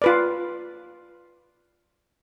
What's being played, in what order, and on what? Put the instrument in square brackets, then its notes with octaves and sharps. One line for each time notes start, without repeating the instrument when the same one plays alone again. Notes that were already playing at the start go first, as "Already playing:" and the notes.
[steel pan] F4 B4 D5